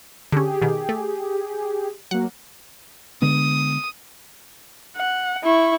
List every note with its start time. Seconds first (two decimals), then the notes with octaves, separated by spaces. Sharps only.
0.32 D3 C#4 G4 G#4
0.62 B2 D#3
0.89 A3
2.11 F#3 A#3 F#5
3.22 D3 G#3 B3 D#6
4.97 F#5
5.44 E4 C#6